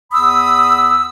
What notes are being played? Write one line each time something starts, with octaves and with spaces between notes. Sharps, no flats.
E2 B5 D#6 E6